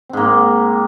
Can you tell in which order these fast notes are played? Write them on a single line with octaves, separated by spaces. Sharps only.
C4 G#2 A#3